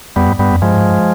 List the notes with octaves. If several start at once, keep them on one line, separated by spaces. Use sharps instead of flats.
F2 G3 B3
G2
G2 G3 B3
F2
G2 F3 G#3
G#2
G2